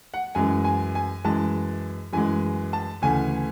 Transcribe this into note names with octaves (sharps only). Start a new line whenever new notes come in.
F#5
F#2 E3 G#3 G#5
G#5
G#5
F#2 E3 G#3 A5
F#2 E3 G#3 G#5
A5
D2 C#3 E3 A3 G#5